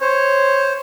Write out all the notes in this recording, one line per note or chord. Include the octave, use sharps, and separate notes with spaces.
C5 C#5